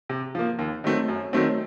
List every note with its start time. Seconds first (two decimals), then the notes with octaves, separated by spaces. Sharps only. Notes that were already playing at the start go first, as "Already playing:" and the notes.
0.09 C3
0.35 F3 A#3
0.59 D#2
0.84 D#3 F#3 A3 C4
1.08 F#2
1.33 D#3 F#3 A3 C4